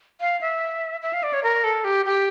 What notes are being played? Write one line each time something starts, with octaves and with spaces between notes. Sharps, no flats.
F5
E5
E5
F5
D5
C#5
A#4
A4
G4
G4